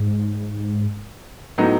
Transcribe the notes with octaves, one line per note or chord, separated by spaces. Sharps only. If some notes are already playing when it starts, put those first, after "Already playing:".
Already playing: G#2
A2 F#3 B3 D#4